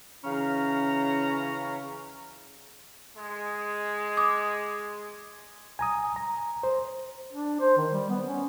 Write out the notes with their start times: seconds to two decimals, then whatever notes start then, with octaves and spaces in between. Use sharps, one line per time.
0.24 C#3 E3 C#4 F5 A#5
3.17 G#3
4.17 D6 D#6
5.79 G#5 A#5 D#6
6.16 A#5
6.63 C5
7.32 D4
7.60 C5
7.77 D#3
7.91 G3
8.10 B3
8.25 C#4